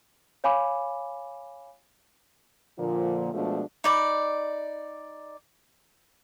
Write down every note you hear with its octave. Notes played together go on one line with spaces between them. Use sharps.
C#5 F5 G#5 B5 D6
A#2 D3 F3
B2 F3 G#3 A3 D4 F4
D#4 D5 B5 D6